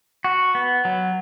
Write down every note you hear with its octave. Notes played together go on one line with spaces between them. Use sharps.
F#4
B3
F#3